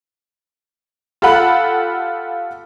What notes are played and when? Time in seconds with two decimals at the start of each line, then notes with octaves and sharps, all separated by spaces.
1.22 F4 G4 A4 F#5 B5